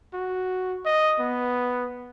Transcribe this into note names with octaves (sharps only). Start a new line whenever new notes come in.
F#4
D#5
B3